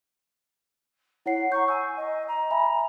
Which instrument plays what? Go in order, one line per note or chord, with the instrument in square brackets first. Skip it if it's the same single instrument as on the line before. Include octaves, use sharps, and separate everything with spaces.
[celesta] E4 C#5 C7 [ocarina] F#5
[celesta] A#5 G6 [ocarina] C#6
[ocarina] G#5 [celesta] E6
[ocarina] D#5
A#5
[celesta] E5 G#5 B5